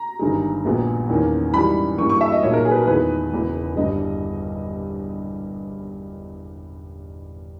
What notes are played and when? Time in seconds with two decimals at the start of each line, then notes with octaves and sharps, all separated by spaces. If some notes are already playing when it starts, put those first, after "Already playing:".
Already playing: A#5
0.19 G1 G2 D#3 G#3
0.65 A#1 A#2 G#3 B3
1.09 E2 D#3 A#3 C#4
1.53 G#2 E3 G3 C#4 B5
1.98 G2 E3 A#3 C#6
2.09 C#6
2.21 E5
2.32 D#5
2.43 B1 A#2 A#3 C#5
2.53 A#4
2.65 G#4
2.71 B4
2.76 A#4
2.87 E2 D#3 G#3 B3 B4
3.32 E1 E2 C#3
3.76 G1 G2 G3 D#5